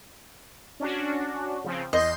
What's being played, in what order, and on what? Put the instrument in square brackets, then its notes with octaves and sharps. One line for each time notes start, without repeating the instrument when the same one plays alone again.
[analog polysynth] C#4 D4 F#4
C#3 F3 C4
[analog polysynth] E2 C6 G6 [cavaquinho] D#5